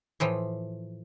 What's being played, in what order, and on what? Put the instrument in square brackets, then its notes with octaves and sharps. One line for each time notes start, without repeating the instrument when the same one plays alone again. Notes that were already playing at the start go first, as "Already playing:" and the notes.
[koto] A2 E3 F3